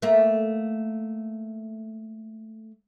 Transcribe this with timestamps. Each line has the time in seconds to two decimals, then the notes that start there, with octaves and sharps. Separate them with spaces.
0.02 A3 A#3